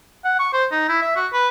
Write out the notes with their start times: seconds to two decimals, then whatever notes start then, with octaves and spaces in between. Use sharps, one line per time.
0.25 F#5
0.39 C#6
0.53 C5
0.71 D#4
0.88 E4
1.02 E5
1.16 F#4
1.33 B4